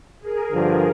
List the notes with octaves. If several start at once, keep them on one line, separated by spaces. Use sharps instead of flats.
G#4 A#4
G2 D3 F3